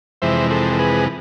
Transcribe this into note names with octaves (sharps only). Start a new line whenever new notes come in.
F2 C3 E3 G#3 C5 E5
A4 C5
A4
G#4 B4